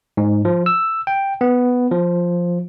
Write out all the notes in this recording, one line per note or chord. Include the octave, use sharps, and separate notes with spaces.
G#2
F3
E6
G5
B3
F3